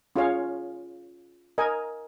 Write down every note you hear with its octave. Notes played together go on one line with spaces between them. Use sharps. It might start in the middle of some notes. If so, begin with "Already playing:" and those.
C#4 F4 G#4 C#5 F5
A#4 D#5 G#5